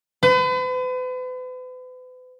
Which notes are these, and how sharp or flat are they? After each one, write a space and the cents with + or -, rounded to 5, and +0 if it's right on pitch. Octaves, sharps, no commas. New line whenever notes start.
B4 +40